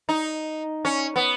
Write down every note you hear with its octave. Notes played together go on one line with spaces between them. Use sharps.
D#4
C#4
B3